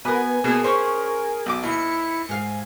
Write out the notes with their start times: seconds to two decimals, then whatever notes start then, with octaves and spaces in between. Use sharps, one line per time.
0.05 B3 F#4 A#4 B4 G#5
0.44 B2 A#3 G#4
0.64 C#4 A#4 C5 C#5
1.46 B1 D6
1.63 D#2 E4 C#7
2.29 G#2 F5 G#5